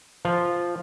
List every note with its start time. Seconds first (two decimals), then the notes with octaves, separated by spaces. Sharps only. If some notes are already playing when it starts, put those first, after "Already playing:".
0.25 F3 F4